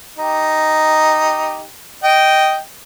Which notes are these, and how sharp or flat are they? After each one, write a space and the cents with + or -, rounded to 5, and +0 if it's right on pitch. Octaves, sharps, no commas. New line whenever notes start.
D#4 +0 G4 +0
D#5 +0 G5 -10